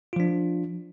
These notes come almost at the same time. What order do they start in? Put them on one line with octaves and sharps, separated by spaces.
F4 F3 D4